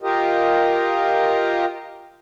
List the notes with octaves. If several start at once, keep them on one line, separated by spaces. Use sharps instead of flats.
F4 G4 A#4 D#5